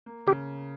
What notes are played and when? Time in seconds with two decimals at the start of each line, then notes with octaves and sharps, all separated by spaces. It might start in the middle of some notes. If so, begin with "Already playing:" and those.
0.06 A#3
0.27 C#3 G4